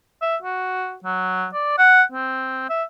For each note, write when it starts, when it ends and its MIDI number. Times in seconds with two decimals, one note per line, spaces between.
0.21 0.36 76
0.42 0.95 66
1.04 1.47 54
1.54 1.75 74
1.78 2.02 78
2.12 2.69 60
2.69 2.83 76